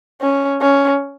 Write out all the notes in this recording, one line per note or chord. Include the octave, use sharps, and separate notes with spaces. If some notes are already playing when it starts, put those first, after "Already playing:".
C#4
C#4